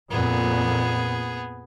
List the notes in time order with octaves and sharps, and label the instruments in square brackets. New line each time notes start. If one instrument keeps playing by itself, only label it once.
[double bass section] F2 A#2 [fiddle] B3 G#4